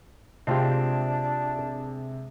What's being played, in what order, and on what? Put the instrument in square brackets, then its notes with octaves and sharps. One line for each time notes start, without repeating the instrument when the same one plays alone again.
[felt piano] C3 G#3 G#4 [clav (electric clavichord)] C4 F4 G4 [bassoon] D4